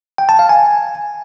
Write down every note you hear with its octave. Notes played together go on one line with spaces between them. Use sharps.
G5
A5
F5
G#5